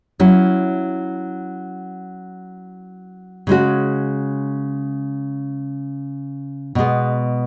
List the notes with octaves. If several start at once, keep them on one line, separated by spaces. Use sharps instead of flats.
F#3 C#4 E4
C#3 G#3 C#4 F#4
B2 G#3 B3